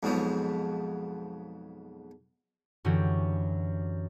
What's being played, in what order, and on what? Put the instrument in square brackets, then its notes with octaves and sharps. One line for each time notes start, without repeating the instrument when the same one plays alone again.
[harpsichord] F2 G#2 B2 F3 F#3
[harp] F#2 D3 E3 F#4 G4